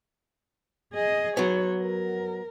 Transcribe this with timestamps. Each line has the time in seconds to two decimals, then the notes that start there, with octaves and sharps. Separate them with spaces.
0.93 G#4 D#5
1.37 F#3 B3 C#5
1.80 A#4